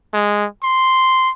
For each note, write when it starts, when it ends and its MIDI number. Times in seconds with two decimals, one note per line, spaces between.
0.14 0.46 56
0.63 1.31 84